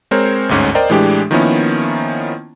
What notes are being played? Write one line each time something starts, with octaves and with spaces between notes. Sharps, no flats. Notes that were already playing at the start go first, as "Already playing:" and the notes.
G#3 C4 A#4 C5 C#5
G1 D2 G#2 C#4
A#4 C5 D5 D#5 G5 A#5
A2 E3 G#3 D4 G4
D#3 F3 A#3 B3 C#4 E4